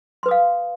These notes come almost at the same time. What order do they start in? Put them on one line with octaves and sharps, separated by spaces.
C6 B4 D#6 F5